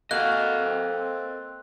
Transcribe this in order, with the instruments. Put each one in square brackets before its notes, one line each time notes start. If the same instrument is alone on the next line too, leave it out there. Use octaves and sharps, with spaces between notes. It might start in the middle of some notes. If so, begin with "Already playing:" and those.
[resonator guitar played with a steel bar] A#3 [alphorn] F#4 [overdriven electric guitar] A4 D#5 [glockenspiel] F#6
[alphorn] C4